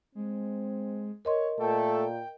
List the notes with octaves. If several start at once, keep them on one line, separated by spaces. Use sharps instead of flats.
G#3 C4
A#4 C#5 D#5 C6
A#2 A3 A4 G5